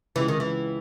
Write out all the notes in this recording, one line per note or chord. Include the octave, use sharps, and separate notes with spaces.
C#2 C#3 E3 G#3
D#3
E3